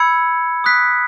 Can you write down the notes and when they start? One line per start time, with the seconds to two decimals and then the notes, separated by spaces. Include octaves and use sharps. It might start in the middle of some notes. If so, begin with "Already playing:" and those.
Already playing: B5 E6 G#6 C#7
0.64 D#6 F#6 B6